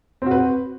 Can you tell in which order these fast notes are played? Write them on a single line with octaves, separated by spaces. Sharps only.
C4 F#4 B4